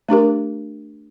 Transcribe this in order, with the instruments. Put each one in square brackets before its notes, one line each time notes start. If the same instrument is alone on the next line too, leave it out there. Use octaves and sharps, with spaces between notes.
[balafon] A3 D4 G4 A#4